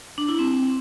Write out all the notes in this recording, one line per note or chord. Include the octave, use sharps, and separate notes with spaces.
D4
E4
C4